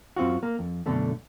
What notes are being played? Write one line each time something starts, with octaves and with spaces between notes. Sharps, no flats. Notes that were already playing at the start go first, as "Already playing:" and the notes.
F#2 C4 F4 F#4
A#3
F2
F#2 B2 D3 A3 D4